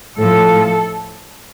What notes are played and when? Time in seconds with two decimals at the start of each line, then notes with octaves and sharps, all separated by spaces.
0.18 A2 F3 A4